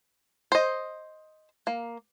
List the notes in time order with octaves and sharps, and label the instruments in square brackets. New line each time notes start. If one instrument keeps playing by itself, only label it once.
[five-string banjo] C5 D#5
A#3